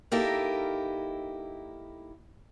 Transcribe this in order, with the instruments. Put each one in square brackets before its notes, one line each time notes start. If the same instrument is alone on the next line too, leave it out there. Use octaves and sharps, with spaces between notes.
[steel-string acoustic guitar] A#3 D#4 E4 G4 A4 A#4